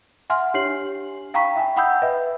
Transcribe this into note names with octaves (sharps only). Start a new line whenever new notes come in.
E5 F#5 G#5 C6 F6
D4 G4 C#5 C7 F#7
F5 G5 A#5 B5 C#6 B6
E5 G5 G#5
F#5 G5 B5 D#6 E6 G6
B4 D#5 E5